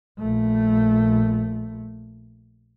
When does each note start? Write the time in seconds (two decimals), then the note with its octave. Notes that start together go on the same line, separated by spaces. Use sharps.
0.18 A#1 A3